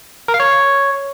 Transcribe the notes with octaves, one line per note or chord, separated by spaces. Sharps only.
A#4
F5
C#5